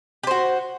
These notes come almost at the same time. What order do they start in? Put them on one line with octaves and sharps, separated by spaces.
G4 C5 F#4